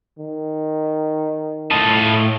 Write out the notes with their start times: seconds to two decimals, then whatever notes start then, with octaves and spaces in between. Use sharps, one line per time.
0.19 D#3
1.71 A2 F4 D#5 A5